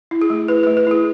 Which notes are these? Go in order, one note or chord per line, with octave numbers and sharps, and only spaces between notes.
E4
G#4
A3
E4 B4
A3 B4
B4
E4 G#4